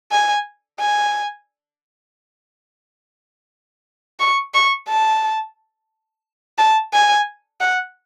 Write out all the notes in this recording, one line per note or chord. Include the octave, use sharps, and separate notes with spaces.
G#5
G#5
C#6
C#6
A5
A5
G#5
F#5